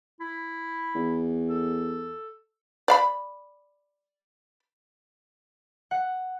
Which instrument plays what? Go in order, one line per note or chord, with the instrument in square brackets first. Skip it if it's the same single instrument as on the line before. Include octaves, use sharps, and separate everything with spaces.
[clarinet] E4
[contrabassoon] E2
[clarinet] A4
[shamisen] D5 F5 B5
[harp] F#5